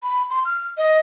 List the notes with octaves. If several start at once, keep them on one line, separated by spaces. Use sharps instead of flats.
B5
C6
F6
D#5